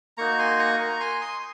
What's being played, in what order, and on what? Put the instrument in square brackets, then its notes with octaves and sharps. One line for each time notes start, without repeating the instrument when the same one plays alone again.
[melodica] A#3 D#4 F#4 A#5 C#6
G#5 C6
A#5 C#6
A#5 C#6
G#5 C6
C6 D#6